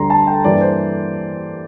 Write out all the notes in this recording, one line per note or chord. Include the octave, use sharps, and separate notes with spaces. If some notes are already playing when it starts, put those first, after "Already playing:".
Already playing: D2 D3 G3 A#5 C6
A5
G5
G2 E3 A#3 D5
C5